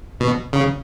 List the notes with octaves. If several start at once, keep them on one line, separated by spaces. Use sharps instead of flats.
B2
C#3